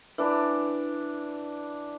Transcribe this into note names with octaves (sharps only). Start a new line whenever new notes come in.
E3 D4